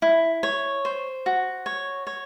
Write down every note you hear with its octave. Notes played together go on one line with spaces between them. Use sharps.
E4
C#5
C5
F#4
C#5
C#5